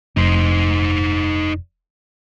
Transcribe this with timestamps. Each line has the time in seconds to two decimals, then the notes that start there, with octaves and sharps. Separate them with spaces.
0.17 F1 D#4 C5